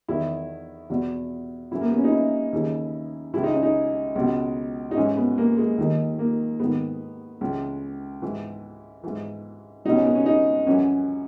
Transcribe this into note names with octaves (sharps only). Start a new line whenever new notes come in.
E2 D#3 E4
E2 B2
F#2 C#3 E3 E4
A#3
B3
C#4
D#4
E4
D#2 C#3 E3
C#2 C#3 E3 E4
D#4
C#4
D#4
C#2 B2
D#4
G#2 E3 C#4
B3
A#3
G#3
D#2 D#3
A#3
G#2 D#3 B3
C#2 C#3 E3
G#2 E3
G#2 E3
C#2 B2 D#4
C#4
B3
C#4
D#4
F#2 E3 C#4